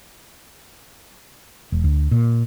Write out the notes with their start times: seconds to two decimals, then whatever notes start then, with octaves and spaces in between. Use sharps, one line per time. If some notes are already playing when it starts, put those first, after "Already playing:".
1.72 E1
1.84 D2
2.11 A#2